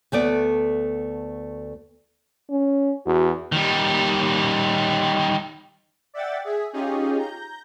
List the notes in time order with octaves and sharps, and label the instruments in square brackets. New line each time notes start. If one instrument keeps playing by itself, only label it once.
[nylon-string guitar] D2 A3 B3 D5
[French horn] C#4
[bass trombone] E2 [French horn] F#4
[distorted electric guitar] D#3 G3
[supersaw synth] D5 E5 F#5 G5 A6
G#4 E5
C#4 D#4 F4 G4 G#4
A#5 G6